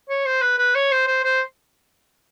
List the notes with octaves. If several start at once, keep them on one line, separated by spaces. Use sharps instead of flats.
C#5
C5
B4
B4
C#5
C5
C5
C5